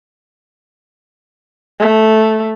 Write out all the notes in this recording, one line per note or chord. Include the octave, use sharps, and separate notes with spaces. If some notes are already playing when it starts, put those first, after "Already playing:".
A3